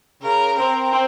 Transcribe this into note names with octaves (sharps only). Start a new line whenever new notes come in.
C#3 A#4
C4 A#4
C4